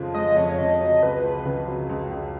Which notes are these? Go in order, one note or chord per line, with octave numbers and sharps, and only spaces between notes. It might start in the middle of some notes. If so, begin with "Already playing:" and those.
Already playing: F2 C#3 F3 G#3
G#3 D#5
F2 C#5
C#3 D#5
F#3
C#2 B4
C#2
C#3
F#3
C#2
C#2